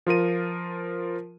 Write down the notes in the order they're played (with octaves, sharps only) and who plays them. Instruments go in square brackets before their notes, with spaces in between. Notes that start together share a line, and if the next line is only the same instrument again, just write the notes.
[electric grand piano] F3 F4 A#4 D#7